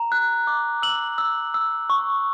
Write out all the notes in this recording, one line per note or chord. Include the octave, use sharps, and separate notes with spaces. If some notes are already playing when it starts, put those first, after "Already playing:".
Already playing: A#5
F#6
D6
E6 F#7
E6
E6
C#6